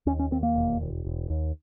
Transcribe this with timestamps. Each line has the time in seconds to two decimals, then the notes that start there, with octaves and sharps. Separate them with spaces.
0.06 D#2 C#4
0.19 C#4
0.31 D#2 C4
0.43 A#3
0.56 E1
0.81 E1
1.05 E1
1.30 D#2